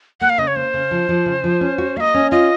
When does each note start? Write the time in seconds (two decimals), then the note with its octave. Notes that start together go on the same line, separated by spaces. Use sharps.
0.21 A#3 F#5
0.30 F5
0.38 C#3 D#5
0.47 C#5
0.56 A#3 C5
0.74 C#3
0.91 F3
1.09 F3
1.26 C#3
1.44 F3
1.61 C#4
1.78 F#4
1.96 A#3 F5
2.00 D#5
2.14 C#4
2.31 F4 D#5